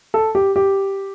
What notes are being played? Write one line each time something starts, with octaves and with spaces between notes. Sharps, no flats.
A4
G4
G4